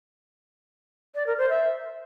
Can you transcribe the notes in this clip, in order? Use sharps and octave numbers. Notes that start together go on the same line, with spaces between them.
D5
A#4
C5
E5